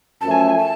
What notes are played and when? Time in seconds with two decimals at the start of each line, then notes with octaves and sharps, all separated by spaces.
0.21 F#2 F3 A3 A5
0.31 G#5
0.39 A5
0.49 G#5
0.58 A5